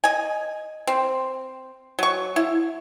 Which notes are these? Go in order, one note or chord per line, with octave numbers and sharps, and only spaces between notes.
D#5 G#5
C4
F#3 C#6
E4